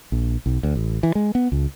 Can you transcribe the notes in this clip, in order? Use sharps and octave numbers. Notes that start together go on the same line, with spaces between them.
A#1
B1
D2
A1
E3
G#3
B3
C#2